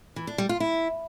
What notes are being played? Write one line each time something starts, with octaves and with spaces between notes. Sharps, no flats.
E3
D4
G3
F4
E4